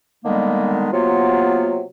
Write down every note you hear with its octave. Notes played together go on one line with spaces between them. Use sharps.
D3 D#3 G3 G#3 A#3 B3
C3 F#3 A#3 B3 F4